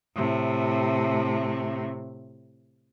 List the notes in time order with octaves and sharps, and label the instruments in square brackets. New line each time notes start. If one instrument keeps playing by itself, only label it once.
[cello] A2 C3